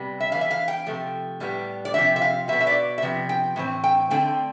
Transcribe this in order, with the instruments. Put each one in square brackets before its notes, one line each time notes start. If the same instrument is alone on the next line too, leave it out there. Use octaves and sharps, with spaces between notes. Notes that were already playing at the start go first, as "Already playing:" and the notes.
Already playing: [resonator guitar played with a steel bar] C3 G3 B3
E5
E3 B3 F5
E5
F5
G5
C3 F3 A3
A2 G3 B3
D5
C3 F3 A3 C4 E5
E5
F5
B2 E5
B3
E5
D5
E5
C3 F3 B3
G5
A2 E3 C4
G5
D3 A3 C4 G5